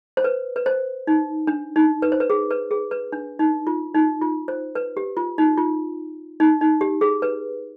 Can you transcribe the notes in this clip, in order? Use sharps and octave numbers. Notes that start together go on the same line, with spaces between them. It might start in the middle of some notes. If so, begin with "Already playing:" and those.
C5
B4
B4
C5
D#4
D4
D#4
B4
C5
B4
G#4
B4
G#4
B4
D4
D#4
F4
D#4
F4
C5
B4
G4
F4
D#4
F4
D#4
D#4
G4
G#4
B4